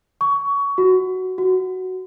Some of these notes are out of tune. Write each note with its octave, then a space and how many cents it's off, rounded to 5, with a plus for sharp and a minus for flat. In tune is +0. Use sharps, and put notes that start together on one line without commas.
C#6 +25
F#4 +5
F#4 +5